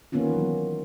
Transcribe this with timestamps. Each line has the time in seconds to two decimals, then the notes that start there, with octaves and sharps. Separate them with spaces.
0.12 D#3 A#3 B3 C#4 F4
0.29 E3 F#3